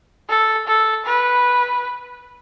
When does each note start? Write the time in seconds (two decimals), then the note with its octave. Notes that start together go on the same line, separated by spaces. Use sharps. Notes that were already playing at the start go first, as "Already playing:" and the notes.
0.29 A4
0.67 A4
1.06 B4